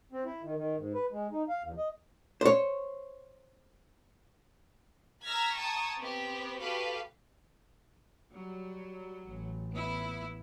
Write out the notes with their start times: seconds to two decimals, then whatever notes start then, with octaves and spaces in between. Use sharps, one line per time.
0.12 C4
0.25 E4
0.43 D#3
0.56 D#3
0.77 G#2
0.94 B4
1.12 G#3
1.32 D#4
1.49 F5
1.64 E2
1.78 D#5
2.41 C5 C#5
5.26 A#5 E6 F6 G#6 A#6 B6
5.56 G5 A5 A#5 C#6 D#6 G#6
6.00 B3 C4 G4
6.60 F#4 G4 A4 B4 F5
8.34 F#3 G3
9.25 A1
9.72 B3 E4